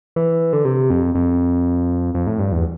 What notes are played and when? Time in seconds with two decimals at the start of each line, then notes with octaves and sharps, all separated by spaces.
0.16 E3
0.53 D3
0.65 C3
0.90 F2
1.15 F2
2.14 F2
2.27 A2
2.39 G2
2.52 E2